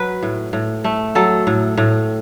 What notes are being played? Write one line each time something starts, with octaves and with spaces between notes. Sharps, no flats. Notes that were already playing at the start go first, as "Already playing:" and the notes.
Already playing: F#3 B4
A2
A2
A3
F#3 A4
A2
A2